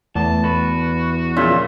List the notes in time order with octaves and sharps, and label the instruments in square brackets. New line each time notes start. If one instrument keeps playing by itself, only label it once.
[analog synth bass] E2 [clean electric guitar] A2 [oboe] A5
[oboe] F#4 [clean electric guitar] B4
[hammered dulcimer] A#2 C#3 F4 [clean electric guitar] F3 F#3 D4 [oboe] E5